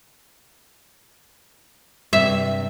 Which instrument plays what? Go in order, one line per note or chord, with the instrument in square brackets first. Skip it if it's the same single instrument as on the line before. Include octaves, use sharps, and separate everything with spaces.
[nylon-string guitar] G2 C3 [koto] E5